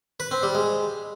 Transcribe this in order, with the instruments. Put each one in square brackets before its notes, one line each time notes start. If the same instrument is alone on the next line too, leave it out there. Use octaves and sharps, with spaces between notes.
[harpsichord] B4
C4
G3
G#3